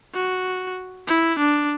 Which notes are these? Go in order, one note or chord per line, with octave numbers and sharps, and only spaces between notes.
F#4
E4
D4